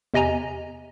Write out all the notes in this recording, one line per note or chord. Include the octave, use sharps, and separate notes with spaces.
E2 C3 D#5 G#5 A#5